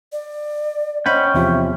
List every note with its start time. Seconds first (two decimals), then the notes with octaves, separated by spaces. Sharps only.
0.12 D5
1.06 C#4 C5 D#5 F#5 G5 B5
1.34 E2 C3 F3 E5